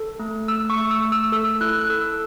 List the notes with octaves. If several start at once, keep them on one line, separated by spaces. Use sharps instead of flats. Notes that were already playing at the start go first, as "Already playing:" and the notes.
Already playing: A4
A3
A3 E6
C#6
A3
E6
A3
E6
A4 E6
E4 F#6
F#6
A4 E6